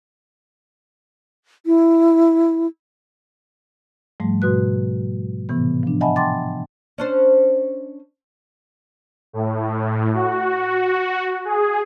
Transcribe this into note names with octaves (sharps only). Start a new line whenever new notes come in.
E4
G#2 F3 G3 A3
G#2 B2 F#4 B4 F#6
A2 C3 E3 B3
F3 D4
D#5 E5 F#5 G#5 A5 B5
G5 A5 C6 D6 A6
C#4 D4 C5
A2
F#4
G#4